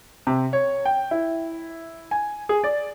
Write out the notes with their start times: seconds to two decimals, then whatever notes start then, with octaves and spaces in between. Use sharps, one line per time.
0.27 C3
0.53 C#5
0.85 G5
1.11 E4
2.11 G#5
2.49 G#4
2.64 D5